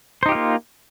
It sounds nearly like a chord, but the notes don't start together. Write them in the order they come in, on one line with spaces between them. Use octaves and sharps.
C5 D#4 G4 F4 A#3